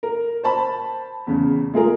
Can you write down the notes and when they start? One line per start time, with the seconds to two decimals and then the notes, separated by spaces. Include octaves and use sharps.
0.03 A#4
0.43 C5 A5 B5
1.27 E2 C#3
1.74 G#3 F4 G#4 A#4